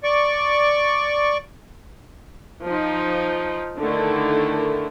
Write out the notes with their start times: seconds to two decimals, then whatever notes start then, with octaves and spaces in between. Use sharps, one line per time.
0.04 D5 C#6
2.64 F3 D#4
3.80 D3 D#3 A3 E4